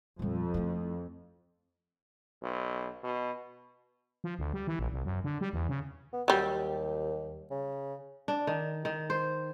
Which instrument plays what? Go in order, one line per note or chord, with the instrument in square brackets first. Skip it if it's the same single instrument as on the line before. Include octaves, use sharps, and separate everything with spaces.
[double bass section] F2 [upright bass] A#2 G3
[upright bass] A3 E4
[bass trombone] B1
B2
[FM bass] F3
D2
G3
E3
A#1
C2
F#2
D3
G3
E2
C#3
[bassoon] B3
[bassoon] D#2 [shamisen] F#3 G3
[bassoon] C#3
[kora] D4
D#3
D#3
C5